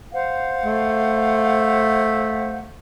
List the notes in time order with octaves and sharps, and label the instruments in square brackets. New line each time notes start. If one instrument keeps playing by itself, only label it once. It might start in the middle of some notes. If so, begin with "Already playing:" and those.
[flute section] C5 F5 F#5
[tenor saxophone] A3